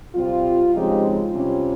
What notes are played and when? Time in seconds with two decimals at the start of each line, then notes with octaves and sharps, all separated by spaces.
0.15 C3 G3 C4 F4
0.74 C#3 F3 G#3 C4 D#4 G4
1.05 F4
1.34 C3 G3 C#4